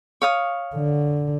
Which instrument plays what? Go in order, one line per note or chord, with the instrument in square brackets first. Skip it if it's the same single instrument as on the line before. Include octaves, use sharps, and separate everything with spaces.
[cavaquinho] C#5 F5 D#6
[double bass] D3